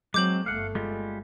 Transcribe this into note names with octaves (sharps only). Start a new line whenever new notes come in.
F#3 G#3 C4 D6 G6 F#7
G1 A3 F5 F#5
G3 G#3 F4